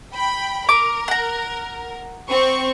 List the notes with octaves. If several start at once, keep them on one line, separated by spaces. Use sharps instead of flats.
G5 B5
A#4 D6
F#5 A#5
C4 C#6